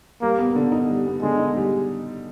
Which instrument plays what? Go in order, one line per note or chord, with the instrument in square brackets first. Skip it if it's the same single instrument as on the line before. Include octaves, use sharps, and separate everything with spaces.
[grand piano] G3 [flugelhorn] A#3
[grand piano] B3
D3
D#4
G3
B3
[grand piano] D3 [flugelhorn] G#3
[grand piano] D#4
G3